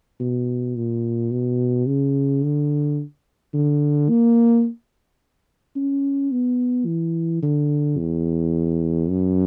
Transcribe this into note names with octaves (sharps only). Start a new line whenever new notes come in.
B2
A#2
B2
C#3
D3
D3
A#3
C#4
B3
E3
D3
E2
F#2